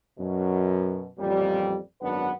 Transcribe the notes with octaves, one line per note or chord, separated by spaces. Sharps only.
F#2 B2
A1 F2 A#2 G3
G#1 F#2 B3 D4 B4 F#5